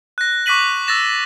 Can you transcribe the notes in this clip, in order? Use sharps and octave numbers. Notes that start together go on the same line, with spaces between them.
F#6 A#6
C#6 D6 F#6 B6 D#7 F#7
E6 A6 A#6 E7